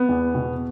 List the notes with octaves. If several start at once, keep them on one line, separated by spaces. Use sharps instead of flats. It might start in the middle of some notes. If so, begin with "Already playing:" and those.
Already playing: B3
E2
B2